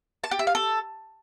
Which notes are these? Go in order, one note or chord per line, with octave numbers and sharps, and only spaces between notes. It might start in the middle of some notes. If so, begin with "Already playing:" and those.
A5
G4
E5
F5
A4